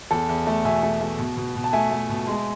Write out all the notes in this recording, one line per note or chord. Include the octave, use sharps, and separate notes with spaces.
E2 A4
E2
A3
B2 E5 G#5
A3
A3
B2
B2
B2
A5
A3 E5 G#5
A3
B2
G#3